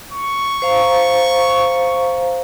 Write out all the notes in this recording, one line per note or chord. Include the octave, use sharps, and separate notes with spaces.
C#6
C5 F5 A#5